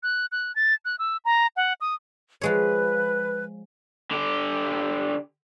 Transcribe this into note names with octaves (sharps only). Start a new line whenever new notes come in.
F#6
F#6
A6
F#6
E6
A#5
F#5
D#6
F3 G#3 B4 C#5
D3 G4